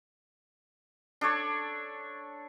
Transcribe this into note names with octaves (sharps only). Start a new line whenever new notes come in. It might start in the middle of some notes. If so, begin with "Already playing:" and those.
D4 A4 C#5 C#6